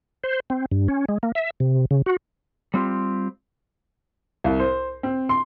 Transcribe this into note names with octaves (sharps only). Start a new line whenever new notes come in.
C5
C4
G2
C#4
G#3
A#3
E5
C3
C#3
F#4
G3 C4 F4 G4
C2
C5
C4
C6